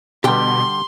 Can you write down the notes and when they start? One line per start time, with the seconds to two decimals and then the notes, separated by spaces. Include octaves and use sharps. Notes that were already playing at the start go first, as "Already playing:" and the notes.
0.24 B2 D3 G3 G4 G5 C6